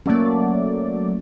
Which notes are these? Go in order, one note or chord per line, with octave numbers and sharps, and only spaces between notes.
F#3 A3 A#3 C#4 D5